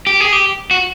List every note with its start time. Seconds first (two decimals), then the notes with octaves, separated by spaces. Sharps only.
0.07 G4
0.20 G#4
0.32 G4
0.71 F#4